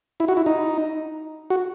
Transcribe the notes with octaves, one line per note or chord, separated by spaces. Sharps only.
E4
F#4
E4
D#4
F#4